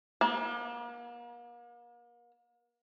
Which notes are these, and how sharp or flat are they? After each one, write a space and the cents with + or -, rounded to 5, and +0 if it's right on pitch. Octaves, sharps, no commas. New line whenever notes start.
A#3 +40